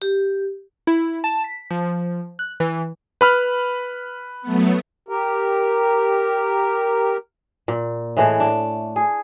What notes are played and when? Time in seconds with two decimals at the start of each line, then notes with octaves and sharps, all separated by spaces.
0.02 G4
0.87 E4
1.24 A5
1.44 B6
1.71 F3
2.39 F#6
2.60 E3
3.21 B4 B5 F6
4.42 F#3 A3 B3
5.09 G4 A#4
7.68 A#2
8.17 A2 E3 G#3 A3
8.40 D4
8.96 G#4